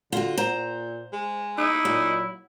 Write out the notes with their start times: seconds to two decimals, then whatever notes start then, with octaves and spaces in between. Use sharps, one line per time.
0.12 D3 F4 F#4
0.37 A#2 C5 A#5
1.13 G#3
1.58 D#4 E4
1.85 A#2 F#3